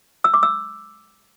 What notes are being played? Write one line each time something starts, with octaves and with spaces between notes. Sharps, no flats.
E6
D6
E6